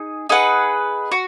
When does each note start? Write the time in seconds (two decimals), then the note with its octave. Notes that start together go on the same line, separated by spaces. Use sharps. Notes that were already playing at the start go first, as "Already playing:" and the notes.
Already playing: D#4 G#4
0.29 D#4 G#4 B4 F#5
1.12 F#4